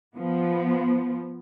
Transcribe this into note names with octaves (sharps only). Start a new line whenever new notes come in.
F3 B3